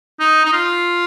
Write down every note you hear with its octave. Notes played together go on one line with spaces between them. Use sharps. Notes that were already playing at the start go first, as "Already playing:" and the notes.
D#4
D#4
F4